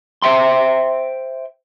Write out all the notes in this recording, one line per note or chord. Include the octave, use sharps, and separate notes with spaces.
C5 E5 G5 C6